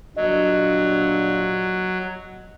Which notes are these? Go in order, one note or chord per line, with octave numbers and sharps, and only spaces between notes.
G1 A#2 F#3 D4 D#5